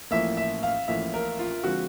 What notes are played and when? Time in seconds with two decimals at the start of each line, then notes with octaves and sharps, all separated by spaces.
0.11 A1 A2 F3 A#3 E5
0.37 E5
0.63 F5
0.88 A1 A2 F3 A#3 E5
1.14 A#4
1.39 F4
1.64 D3 F3 G#3 C4 F#4